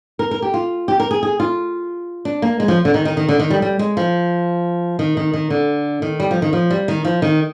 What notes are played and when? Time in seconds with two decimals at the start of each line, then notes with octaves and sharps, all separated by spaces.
0.19 A#4
0.31 A#4
0.42 G4
0.54 F4
0.88 G4
1.00 A#4
1.11 G#4
1.23 G#4
1.40 F4
2.25 D4
2.42 A#3
2.60 G#3
2.68 F3
2.85 D3
2.94 D#3
3.05 D#3
3.17 D#3
3.29 D3
3.39 D#3
3.50 G3
3.62 G3
3.79 G#3
3.97 F3
4.99 D#3
5.17 D#3
5.34 D#3
5.50 D3
6.02 D#3
6.20 G3
6.31 F3
6.42 D#3
6.53 F3
6.70 G3
6.88 D#3
7.05 F3
7.22 D#3